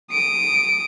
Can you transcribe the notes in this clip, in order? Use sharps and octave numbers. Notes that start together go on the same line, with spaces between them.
D#6 D7